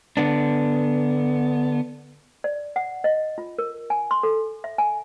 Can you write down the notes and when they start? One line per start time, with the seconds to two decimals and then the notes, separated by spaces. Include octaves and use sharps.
0.17 D3 B3 D4
2.44 D5
2.76 F#5
3.04 D#5
3.38 F4
3.58 A#4
3.90 G#5
4.11 C6
4.23 A4
4.64 E5
4.78 G#5